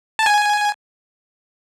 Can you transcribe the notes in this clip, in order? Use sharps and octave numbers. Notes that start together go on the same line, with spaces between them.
A5
G#5